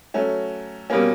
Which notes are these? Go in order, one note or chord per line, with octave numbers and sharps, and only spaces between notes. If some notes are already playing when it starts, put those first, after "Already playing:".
F#3 A3 C#4
B2 G3 A#3 C#4